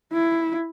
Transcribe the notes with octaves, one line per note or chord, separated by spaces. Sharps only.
E4